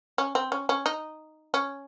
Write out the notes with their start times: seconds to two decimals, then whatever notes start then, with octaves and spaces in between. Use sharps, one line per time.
0.18 C#4
0.35 C4
0.52 C#4
0.69 C#4
0.86 D#4
1.54 C#4